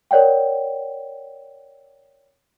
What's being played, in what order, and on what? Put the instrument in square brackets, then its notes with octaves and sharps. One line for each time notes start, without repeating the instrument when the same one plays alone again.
[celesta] A#4 C#5 D5 F#5 G5